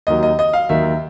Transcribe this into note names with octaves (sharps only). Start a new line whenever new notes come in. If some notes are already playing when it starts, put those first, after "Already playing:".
D#2 D#3 F#3 D#5
D#5
D#5
F5
D#2 D#3 F#3 E5